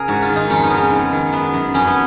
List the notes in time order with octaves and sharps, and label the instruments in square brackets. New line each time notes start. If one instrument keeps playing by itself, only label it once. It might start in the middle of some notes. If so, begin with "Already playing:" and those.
Already playing: [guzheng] C#3 G#4 A#4
G#2 F#4
F4
D#3
D#4
F2 C#4
B3
C#3
C#4
G#2
D#3
F#2 B3
F#2
F2 C#4
B3